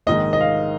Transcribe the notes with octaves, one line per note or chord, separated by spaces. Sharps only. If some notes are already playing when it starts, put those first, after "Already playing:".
A#1 G#2 D#3 D#5
D#5
F5